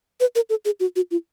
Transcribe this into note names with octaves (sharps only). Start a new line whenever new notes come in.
B4
A#4
A4
G#4
F#4
F#4
F4